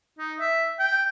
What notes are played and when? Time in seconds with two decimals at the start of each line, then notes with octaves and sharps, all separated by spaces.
0.19 D#4
0.40 E5
0.79 G5